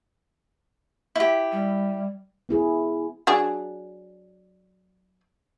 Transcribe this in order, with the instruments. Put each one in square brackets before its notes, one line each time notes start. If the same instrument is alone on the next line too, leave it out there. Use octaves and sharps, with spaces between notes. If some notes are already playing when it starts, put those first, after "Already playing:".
[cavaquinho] E4 G4
[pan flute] G3
[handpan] B3 E4 G#4
[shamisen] F#3 D4 G#4